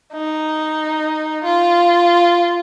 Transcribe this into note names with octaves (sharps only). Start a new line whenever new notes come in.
D#4
F4